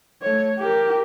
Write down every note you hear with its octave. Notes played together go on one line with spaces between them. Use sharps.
A3 C#5
G4 A#4